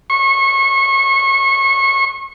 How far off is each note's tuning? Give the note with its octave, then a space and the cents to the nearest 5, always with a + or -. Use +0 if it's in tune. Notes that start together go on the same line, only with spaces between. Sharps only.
C#6 -30